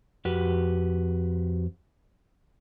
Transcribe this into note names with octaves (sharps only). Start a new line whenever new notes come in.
F2 F#4 G4 B4